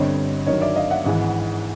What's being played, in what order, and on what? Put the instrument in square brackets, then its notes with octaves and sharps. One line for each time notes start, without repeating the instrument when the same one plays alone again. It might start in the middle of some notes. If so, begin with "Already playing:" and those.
Already playing: [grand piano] G1 G2 D3 G3 C4 C#5 D#5
G2 D#3 F#3 C#5 D#5
D5 E5
D#5 F5
E5 F#5
G#1 G#2 E3